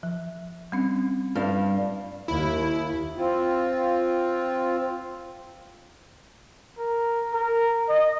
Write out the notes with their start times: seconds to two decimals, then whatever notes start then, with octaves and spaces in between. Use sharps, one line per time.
0.03 F3
0.72 G3 C4 C#4
1.35 G2 F5
2.28 D#2 E4
3.17 C4 F4
6.78 A#4
7.33 A#4
7.89 D#5